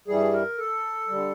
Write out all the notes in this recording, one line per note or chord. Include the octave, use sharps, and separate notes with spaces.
G2 E3 G3 G#4
A#4
A4
D3 G3